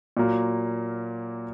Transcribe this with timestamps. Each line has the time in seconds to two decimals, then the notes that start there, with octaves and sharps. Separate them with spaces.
0.17 A#2 F#3 A#3